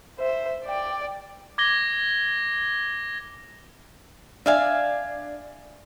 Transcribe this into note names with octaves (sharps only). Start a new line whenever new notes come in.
C5 E5
D5 G5
D6 G#6 A#6 G7
D4 E5 F5 G#5